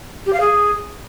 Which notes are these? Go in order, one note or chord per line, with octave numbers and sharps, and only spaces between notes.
G4
F5
G#4